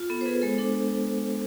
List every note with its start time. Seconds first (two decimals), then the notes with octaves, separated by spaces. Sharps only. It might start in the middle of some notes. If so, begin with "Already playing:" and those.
Already playing: F4
0.09 B3 A4
0.21 C5
0.26 B3 G#4 B4
0.42 G#3 A4 C5
0.58 D4 A4